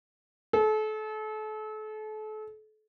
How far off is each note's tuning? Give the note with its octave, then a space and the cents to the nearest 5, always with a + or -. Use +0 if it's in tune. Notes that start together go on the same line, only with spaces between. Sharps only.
A4 -35